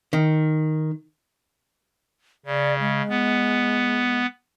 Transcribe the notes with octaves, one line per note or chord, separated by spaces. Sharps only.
D#3
C#3 D5
G#3
B3